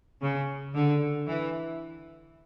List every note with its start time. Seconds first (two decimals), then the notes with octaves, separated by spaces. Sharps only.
0.21 C#3
0.74 D3
1.28 E3